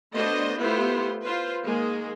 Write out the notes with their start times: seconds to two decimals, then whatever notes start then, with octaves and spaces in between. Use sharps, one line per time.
0.14 A3 B3 D4 F#4 C5 D#5
0.58 A3 B3 E4 F4 G4 C5
1.23 F4 B4 C5
1.62 D#3 G#3 A#3 G#4